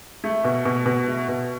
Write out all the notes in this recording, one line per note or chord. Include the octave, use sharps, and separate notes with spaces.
A3
B2
B2
B2
A3
B2